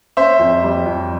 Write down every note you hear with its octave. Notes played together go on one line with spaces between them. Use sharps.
C#4 C5 E5
F2
G3
F2